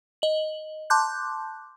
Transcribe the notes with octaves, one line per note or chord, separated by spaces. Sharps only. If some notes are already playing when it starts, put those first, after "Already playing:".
D#5 F#7
A5 C6 D6 F#6 G6